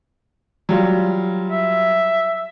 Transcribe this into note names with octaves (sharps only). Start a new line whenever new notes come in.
F#3 G3 F4
E5